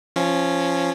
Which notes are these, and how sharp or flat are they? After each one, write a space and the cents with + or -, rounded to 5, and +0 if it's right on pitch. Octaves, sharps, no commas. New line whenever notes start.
F3 -15 C#4 -5